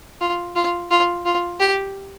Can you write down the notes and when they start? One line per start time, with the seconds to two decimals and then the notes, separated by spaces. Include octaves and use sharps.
0.21 F4
0.56 F4
0.91 F4
1.25 F4
1.60 G4